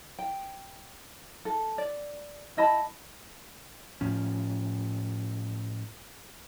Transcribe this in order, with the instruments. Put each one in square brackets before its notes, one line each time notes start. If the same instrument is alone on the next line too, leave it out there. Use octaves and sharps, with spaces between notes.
[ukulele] G5
A4
D5
E4 D#5 A5 B5
[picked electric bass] A2 F3 C#4